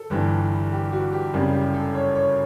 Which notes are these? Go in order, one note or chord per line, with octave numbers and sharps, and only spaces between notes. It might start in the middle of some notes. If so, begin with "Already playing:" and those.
Already playing: A4
G1 G2 E3 G3
G4
F#4
G4
F#1 F#2 C#3 G3
G4
A4
C#5
C#5